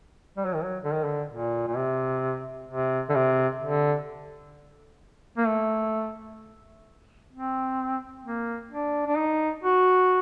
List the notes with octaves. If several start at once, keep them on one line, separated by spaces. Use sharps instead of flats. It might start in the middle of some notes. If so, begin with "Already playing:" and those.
G3
F#3
D#3
F#3
D3
D#3
D3
A#2
A#2
C3
C3
D3
C3
D3
A#3
A3
C4
A#3
D4
D4
D#4
F#4